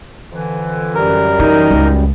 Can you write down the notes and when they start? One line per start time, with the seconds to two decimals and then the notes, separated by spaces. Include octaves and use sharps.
0.32 F2 D3 E3
0.95 F#2 G3 A#4
1.40 E3 D#4
1.71 C#2